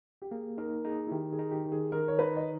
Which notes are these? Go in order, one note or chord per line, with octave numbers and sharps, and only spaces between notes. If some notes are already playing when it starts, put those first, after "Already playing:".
G4
A#3 G#4
D#4 A#4
D#4 G#4
E4
D#3 G4
G#4
D#4
G4
D#3
G#4
D#4 A#4
C#5
D#4 B4
D#5